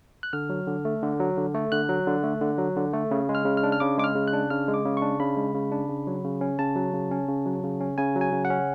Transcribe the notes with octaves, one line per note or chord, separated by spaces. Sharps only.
F#6
D3 F6
F#3
D3
A3
D3
F#3
D3
A3
D3 F#6
F#3
D3
A3
D3
F#3
D3
A3
C#3
G#3
F6
C#3
F6
D4
F6
C#3 D6
G#3 D6
F6
C#3
F#6
D4
C#3 F6
G#3
D6
C#3
C#6
D4
C#3 B5
G#3
C#3
D4
C#3
F#3
C#3
C#4
C#3 A5
F#3
C#3
C#4
C#3
F#3
C#3
C#4
C#3 G#5
F#3
G#5
C#3
F#5
C#4